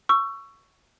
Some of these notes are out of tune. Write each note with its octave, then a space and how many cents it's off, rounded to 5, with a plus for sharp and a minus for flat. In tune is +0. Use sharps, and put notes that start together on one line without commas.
C#6 +5 E6 +25